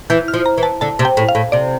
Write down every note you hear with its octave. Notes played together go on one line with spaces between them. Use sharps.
E3 G6
F6
F3
A#5
E3
A5
D3 A5
C3
G5
A2
F5
A2
C3 D5